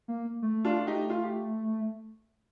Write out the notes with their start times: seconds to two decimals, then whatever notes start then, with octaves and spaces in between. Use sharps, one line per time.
0.08 A#3
0.42 A3
0.65 D4 F4
0.87 D#4 G4
1.10 F4
1.24 G4